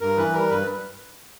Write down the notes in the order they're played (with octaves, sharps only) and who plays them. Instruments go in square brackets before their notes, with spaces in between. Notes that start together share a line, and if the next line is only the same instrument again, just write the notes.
[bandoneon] G2 A#4
E3 B4
G3 A#4
G2 B4